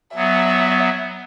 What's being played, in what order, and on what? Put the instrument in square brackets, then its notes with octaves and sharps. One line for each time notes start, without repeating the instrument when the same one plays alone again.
[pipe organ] F#3 B3 [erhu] E5